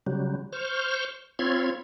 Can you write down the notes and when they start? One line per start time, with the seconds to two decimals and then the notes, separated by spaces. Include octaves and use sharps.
0.07 C#3 F#3 G3
0.53 C5 C#6 F6 G6
1.39 C4 F4 C#5 B5 C6 G#6